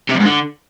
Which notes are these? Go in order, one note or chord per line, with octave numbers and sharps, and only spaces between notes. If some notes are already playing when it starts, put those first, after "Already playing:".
C3
F2
G#2
D3